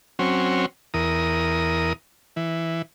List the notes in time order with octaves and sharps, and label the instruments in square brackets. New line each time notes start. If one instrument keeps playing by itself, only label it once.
[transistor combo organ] F#3 C4 C#4
E2 A#4 D#6
E3